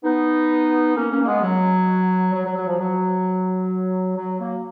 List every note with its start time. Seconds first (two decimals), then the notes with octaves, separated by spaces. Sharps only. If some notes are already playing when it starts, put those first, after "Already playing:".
0.04 B3 D#4
0.96 A#3 C#4
1.11 A#3 C#4
1.22 A#3
1.26 G#3 B3
1.42 F#3
2.33 F#3
2.45 F#3
2.56 F#3
2.68 F3
2.80 F#3
4.17 F#3
4.39 F#3 A#3